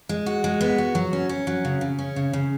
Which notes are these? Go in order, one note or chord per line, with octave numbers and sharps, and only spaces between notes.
G#3
F#4
G#3
B3
F#4
F#3
C#4
C#4
F#3
C#3
C#3
C#4
C#3
C#3